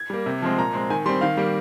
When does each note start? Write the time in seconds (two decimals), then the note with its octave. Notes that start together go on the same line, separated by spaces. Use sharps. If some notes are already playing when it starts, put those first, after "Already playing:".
Already playing: G#6
0.10 G3 A#3
0.26 C3
0.42 F3 G#3 C4
0.58 A#2 A#5
0.73 G#3 C4
0.90 D#3 G#5
1.06 G3 C6
1.09 C4
1.21 D#3 F5
1.37 G3 A#3